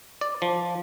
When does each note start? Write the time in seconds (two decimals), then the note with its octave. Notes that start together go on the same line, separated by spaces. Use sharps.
0.21 D5
0.42 F3